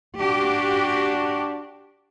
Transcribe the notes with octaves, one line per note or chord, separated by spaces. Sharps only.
D4 F#4 G4